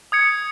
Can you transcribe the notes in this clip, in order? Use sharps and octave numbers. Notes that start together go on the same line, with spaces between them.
D#6 G#6 C#7